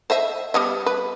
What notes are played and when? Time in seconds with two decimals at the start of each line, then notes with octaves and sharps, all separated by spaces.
0.10 C5 D#5 E5
0.54 G3 B3 D#5
0.86 B4